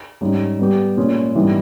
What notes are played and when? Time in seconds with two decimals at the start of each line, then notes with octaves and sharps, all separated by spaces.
0.21 G#2 G3 C#4
0.59 G3 B3 G4
0.97 A#2 G#3 C#4
1.35 G#2 E3 G3 B3